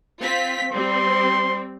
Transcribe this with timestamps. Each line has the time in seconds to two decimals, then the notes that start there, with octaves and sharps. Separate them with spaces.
0.21 C4 F4 B6
0.72 G3 C4 C6